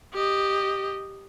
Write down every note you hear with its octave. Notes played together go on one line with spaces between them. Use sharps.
G4 D#5